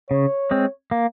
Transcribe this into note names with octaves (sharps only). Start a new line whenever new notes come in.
C#3 C#5
G#3 C4
A#3